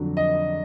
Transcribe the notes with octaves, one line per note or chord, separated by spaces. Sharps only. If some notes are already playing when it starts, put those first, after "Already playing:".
Already playing: F2 D3 F#3 D4
D#5